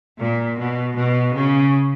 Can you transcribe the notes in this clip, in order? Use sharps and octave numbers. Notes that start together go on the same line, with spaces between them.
A#2
B2
B2
C#3